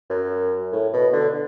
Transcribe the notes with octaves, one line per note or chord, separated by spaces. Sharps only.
F#2
A2
B2
D3